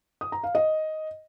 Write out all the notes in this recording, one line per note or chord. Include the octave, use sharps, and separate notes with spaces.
D#6
A#5
F5
D#5